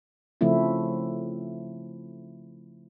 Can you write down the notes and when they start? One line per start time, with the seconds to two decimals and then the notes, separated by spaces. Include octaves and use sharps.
0.41 C#3 F3 A3 C4 E4